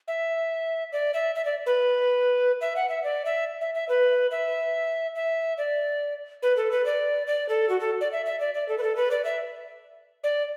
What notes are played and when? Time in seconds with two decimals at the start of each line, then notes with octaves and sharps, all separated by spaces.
0.08 E5
0.92 D5
1.14 E5
1.35 E5
1.45 D5
1.66 B4
2.61 E5
2.76 F#5
2.89 E5
3.04 D5
3.25 E5
3.61 E5
3.75 E5
3.89 B4
4.31 E5
5.16 E5
5.58 D5
6.43 B4
6.57 A4
6.72 B4
6.86 D5
7.27 D5
7.49 A4
7.69 F#4
7.80 A4
8.01 D5
8.12 E5
8.26 E5
8.40 D5
8.55 D5
8.69 A4
8.78 B4
8.83 A4
8.96 B4
9.11 D5
9.25 E5
10.24 D5